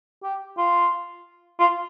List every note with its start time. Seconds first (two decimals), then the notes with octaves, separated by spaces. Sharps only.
0.23 G4
0.58 F4
1.59 F4